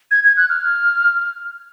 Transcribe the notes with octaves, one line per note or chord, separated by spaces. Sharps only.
G#6
G#6
F#6
F6